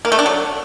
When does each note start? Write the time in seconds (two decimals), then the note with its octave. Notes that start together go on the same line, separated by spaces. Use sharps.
0.05 A#3
0.12 A3
0.19 D4
0.26 F#3